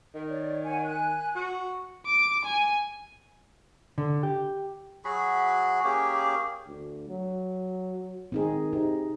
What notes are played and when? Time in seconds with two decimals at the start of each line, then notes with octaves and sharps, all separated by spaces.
0.15 D#3
0.28 C#5 D5
0.63 C#5 F#5 G#5
0.84 G#5 F#6
1.36 F#4
2.06 D6
2.45 G#5
3.98 D3
4.23 G4
5.05 F#3 F#4 G#4 B5
5.84 A#3 C#4 G4 G#4
6.67 D2
7.09 F#3
8.32 D#3 C4 D#4 G#4
8.73 C3 D#4